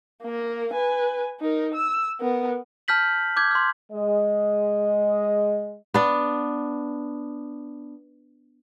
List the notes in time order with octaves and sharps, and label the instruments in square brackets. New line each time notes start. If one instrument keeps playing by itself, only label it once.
[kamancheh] A#3 A#4
B4 G#5
D#4 A#4
E6
B3 A#4
[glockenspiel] A5 F6 G6 B6 F#7
D6 G6 G#6
C6 F6
[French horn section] G#3 D#5
[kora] B3 D4